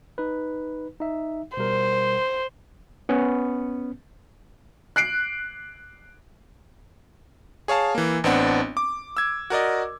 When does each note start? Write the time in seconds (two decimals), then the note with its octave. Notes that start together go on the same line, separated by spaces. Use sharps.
0.18 D#4 B4
1.00 D#4 E5
1.57 B2 G3 A#4 C5
3.09 B3 C#4
4.96 F#6 C7 D7
7.68 G#4 C#5 F5 A5
7.95 E3 A#3
8.24 A1 B3 C4 D4 F#5
8.77 D6
9.17 E6 G#6
9.50 F#4 A#4 D5 D#5